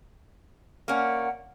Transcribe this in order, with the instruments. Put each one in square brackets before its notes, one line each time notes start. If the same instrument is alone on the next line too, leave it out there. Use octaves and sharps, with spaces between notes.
[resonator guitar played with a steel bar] A#3 C#4 [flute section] D5 F#5